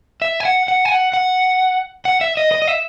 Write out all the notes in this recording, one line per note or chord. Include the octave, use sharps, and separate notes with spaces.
E5
G#5
F#5
F#5
G#5
F#5
F#5
F#5
E5
D#5
D#5
D#5
E5